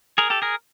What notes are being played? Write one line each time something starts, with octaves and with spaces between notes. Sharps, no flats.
G#4 A#4
G4 A4
G#4 A#4